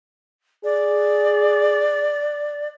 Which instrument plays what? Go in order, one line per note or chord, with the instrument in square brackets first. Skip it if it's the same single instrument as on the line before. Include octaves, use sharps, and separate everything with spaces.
[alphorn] G#4 [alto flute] D5